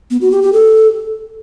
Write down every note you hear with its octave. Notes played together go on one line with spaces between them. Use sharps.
B3
F#4
G4
G4
A4